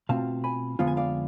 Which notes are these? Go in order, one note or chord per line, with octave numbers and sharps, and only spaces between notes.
B2 A3 C4 F4 F5 A5
G#5 B5
F2 D3 G#3 B3 F4 F5
G#5
D5 F5